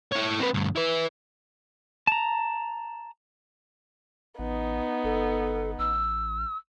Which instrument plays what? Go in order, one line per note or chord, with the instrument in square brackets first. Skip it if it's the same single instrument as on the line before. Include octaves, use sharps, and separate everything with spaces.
[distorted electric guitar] E4 C#5
C4 B4
D2 G2
E4 B4
[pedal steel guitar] A5 A#5
[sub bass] A1 [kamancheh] B3 D#4
[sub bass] G1 [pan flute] A4
[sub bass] A1 [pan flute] E6